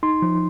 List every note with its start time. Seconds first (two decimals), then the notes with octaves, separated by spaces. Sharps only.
0.03 D#4 C6
0.22 F3